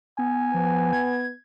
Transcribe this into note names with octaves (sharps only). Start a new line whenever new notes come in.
B3 G#5
F3 B3
G#6